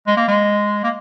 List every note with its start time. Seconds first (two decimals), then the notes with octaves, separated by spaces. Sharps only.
0.07 G#3
0.17 A#3
0.28 G#3
0.84 A#3